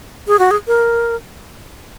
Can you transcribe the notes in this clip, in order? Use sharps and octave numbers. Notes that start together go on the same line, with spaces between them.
G#4
F#4
G#4
A#4